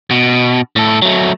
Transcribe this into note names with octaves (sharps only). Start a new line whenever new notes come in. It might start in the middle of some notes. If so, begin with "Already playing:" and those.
B2
A2 A4
F#3 A3